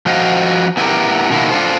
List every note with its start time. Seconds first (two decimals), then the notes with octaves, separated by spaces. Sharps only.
0.06 F3 F#4 C5 D#5 F5
0.77 B3 E4 F4 G4 A#4
1.30 B2 D#3 A#3 E4
1.51 D4 F4 A4 C5